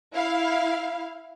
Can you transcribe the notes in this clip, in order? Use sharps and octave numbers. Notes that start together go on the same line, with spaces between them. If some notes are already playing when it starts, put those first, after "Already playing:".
E4 F5